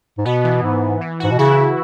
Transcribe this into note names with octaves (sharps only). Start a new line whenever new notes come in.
G#2
B2 B3
E3
G#2
E3
G#2 F#4
B2
C#3 E4